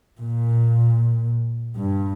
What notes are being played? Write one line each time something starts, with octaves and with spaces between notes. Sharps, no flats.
A#2
G2